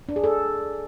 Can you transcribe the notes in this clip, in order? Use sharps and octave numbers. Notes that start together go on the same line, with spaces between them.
D4
G#4
A4